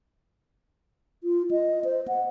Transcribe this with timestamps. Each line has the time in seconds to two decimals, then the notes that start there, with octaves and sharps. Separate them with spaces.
1.24 F4
1.51 D#5
1.84 C5
2.08 F#5